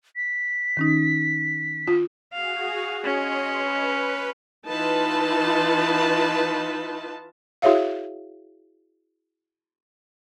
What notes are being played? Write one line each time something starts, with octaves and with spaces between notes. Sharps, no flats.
B6
D#3 C#4 D#4
F4
F#4 G#4 F5
C#4 C#5 D#5 C6
B4
E3 D#4 F4 B4 A5
E4 F#4 G#4 C#5 E5 F5